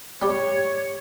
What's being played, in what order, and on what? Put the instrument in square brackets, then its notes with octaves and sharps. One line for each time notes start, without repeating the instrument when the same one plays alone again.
[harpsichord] G3 G4 [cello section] C#5